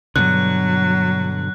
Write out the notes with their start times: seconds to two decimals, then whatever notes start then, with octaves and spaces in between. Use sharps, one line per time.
0.16 G2 B2 D3 F#3 F#6